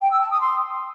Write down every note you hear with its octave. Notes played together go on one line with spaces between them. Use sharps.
G5
E6
A5
D#6
C6